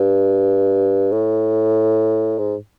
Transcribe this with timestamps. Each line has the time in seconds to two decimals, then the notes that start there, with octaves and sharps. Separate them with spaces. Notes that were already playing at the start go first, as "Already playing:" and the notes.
Already playing: G2
1.12 A2
2.38 G#2